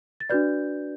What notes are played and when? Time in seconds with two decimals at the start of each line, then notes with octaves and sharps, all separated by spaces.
0.20 A6
0.30 D4 F#4 B4 D5 G6